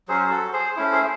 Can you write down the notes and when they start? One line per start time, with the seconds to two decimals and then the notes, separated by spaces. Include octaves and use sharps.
0.08 F#3 C#4 F#4 G#4 C5
0.20 C5
0.30 F#4 A4
0.53 G#4 C5
0.76 A3 C#4 E4
0.92 G#4 C5